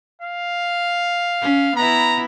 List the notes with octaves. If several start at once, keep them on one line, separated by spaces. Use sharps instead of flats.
F5
C#4
B3 E4 A#5